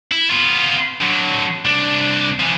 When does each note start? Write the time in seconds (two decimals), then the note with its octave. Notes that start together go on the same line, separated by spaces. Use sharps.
0.11 E4
0.30 B3 F4
1.02 D3 F#3
1.65 C2 D4
2.40 E3 F3